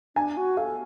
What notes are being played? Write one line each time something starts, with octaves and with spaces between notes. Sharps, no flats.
D4 G#5
F#4
A4 F5